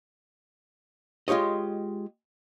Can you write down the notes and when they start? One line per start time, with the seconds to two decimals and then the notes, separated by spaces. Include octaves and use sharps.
1.28 G#3 F4 G4 C#5 D#5